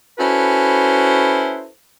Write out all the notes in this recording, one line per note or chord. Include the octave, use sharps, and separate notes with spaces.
C#4 E4 F#4 A4 B4 C5